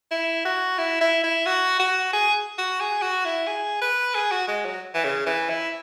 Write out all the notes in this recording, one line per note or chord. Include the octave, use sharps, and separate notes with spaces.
E4
F#4
E4
E4
E4
F#4
F#4
G#4
F#4
G#4
F#4
E4
G#4
B4
G#4
F#4
G#3
F#3
E3
C#3
E3
E4